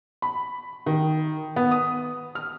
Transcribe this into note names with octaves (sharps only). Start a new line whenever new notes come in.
B5
D#3
B3
D#6
F6